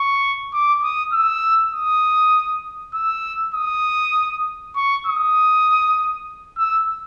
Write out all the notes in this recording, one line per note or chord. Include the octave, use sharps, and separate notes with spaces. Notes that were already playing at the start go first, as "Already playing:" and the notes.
Already playing: C#6
D6
D#6
E6
D#6
E6
D#6
C#6
D#6
E6